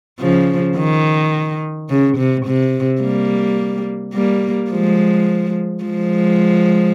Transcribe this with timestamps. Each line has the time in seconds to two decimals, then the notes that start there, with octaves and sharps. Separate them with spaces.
0.19 C#3 F3
0.76 D#3
1.90 C#3
2.17 C3
2.45 C3
3.02 G3 A#3
4.14 G3 A#3
4.71 F3 G#3
5.84 F3 G#3